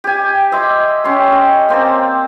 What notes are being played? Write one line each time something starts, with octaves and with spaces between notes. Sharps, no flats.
G4 G#5
D#5 E5 C6 D6
C#4 G4 C6
D#5
A#3 C4 C5 D5